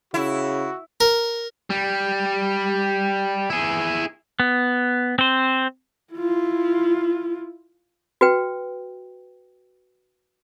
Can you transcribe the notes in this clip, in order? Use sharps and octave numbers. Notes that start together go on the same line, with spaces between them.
C#3 E4 F#4
A#4
G3
E4 G#4
B3
C4 C5
E4 F4
F#4 B4 G5